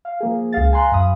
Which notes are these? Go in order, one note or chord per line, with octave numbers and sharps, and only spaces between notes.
F5
F3 A#3 G#4
C#2 G#4 F5 A6
F5 G#5 A#5 C6 F#6
F#2 F5 B5 D#6